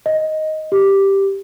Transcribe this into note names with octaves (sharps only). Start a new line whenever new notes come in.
D#5
G4